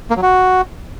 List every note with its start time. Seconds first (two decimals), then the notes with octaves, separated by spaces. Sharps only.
0.11 A#3
0.16 F#3
0.22 F#4